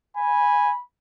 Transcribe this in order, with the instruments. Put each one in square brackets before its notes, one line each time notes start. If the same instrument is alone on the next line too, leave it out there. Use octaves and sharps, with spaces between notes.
[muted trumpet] G#5 [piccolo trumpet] B5